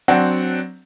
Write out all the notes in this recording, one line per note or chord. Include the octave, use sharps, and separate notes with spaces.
F#3 C4 D4 F#5